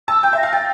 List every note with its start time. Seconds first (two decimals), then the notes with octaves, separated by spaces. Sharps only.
0.08 A5 E6
0.23 G5 G6
0.33 E5 A#6
0.43 F5
0.53 G5 A6